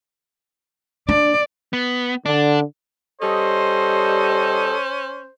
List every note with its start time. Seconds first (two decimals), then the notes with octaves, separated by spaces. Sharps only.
1.09 D4 D5
1.73 B3
2.26 D3 D4
3.22 G3 C#4 A4 C5 D#5